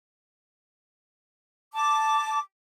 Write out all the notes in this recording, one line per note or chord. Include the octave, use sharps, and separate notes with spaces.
A5 D6